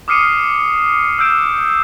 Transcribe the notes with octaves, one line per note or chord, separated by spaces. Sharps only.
D6 D#6 F6 C7 C#7 D#7
E6 F6 G6 D7 E7